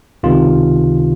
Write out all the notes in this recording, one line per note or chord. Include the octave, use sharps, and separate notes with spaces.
C#2 C3 D#3 F4